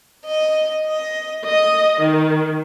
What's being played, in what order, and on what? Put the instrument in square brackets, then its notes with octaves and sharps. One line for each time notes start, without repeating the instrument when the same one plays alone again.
[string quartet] D#5
D#5
D#5
D#3